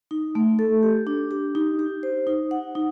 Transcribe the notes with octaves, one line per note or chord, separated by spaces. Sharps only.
D#4
A3
A4
G4
D4
G4
D#4
G4
C5
D#4
F#5
D#4